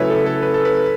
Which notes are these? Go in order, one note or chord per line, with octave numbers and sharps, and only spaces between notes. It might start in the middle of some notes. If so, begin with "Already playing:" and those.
Already playing: C#3 F#3 A3 C#4 E4 B4 C#5
A4
A4
B4
A4
B4